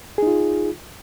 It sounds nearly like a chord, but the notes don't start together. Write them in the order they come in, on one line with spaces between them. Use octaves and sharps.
G#4 D#4 F4